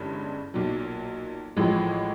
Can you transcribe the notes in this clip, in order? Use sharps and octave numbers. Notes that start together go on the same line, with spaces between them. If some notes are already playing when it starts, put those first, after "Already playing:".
Already playing: G1 G2 E3 G#3 C#4
B1 A#2 F#3
A1 A2 F3 G#3